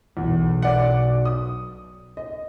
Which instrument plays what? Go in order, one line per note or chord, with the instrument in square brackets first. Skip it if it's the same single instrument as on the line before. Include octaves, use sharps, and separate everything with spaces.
[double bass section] B1 [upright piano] E2
[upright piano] D5 F#5
D#6
D#5